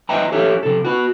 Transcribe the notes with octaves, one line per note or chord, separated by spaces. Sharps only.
B4 D#5 E5 G5 G#5 A#5
G4 A4 C#5 E5
C3 A4
F#4 B4